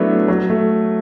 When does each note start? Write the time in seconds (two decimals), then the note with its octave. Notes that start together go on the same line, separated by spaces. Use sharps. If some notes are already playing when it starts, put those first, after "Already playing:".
Already playing: F#3 A3 B3 D4 E4
0.28 F#3
0.50 A3